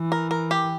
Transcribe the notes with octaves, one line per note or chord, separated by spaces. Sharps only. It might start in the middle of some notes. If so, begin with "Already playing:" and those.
Already playing: E3
A#4
A#4
G4